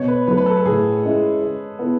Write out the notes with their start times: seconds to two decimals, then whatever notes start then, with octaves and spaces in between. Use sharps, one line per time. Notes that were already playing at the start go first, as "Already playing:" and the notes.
Already playing: B2 C#5
0.08 B4
0.27 F#3 A3 B4
0.37 B4
0.46 A4
0.57 A4
0.65 A2 G#4
1.03 G#3 C#4 E4
1.42 G#3
1.79 B3 E4 A4